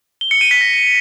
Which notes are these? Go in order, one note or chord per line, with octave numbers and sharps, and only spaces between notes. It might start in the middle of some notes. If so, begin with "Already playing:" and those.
G7
C#7
D#7
B6
A#6